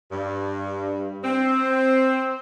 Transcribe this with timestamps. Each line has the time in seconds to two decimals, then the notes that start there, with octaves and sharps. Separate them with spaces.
0.12 G2
1.24 C4